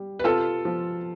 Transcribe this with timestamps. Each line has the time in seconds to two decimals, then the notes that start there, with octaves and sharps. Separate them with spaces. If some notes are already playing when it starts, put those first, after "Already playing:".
Already playing: G3
0.19 B4
0.24 C3 F4 A4
0.65 F3